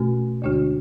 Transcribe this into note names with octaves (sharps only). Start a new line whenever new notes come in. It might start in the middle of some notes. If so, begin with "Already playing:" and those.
Already playing: B2 A3 C#4 F#4
D2 D3 G#3 D4 F#4